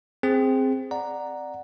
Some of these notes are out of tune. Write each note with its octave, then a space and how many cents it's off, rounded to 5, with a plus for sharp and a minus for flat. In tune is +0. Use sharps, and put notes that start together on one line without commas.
C4 +0 G#4 +0
D5 +10 F#5 +0 A#5 +0